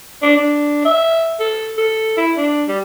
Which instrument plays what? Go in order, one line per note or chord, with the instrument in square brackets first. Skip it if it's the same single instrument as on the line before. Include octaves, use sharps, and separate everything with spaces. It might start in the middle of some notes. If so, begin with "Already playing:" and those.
[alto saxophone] D4
D4
E5
A4
A4
E4
D4
G3